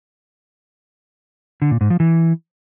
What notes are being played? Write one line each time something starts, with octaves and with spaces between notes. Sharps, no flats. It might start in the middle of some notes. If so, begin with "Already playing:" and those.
D3
A#2
G#2
F3
E3